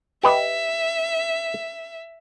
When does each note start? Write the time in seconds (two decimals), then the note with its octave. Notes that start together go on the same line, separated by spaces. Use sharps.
0.23 G4 B4 D#5 E5